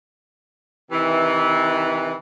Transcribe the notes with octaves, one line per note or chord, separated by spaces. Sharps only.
C3 D#3 E3